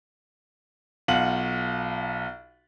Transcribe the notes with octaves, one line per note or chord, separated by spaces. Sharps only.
B1 F4 F5 F#5 F#7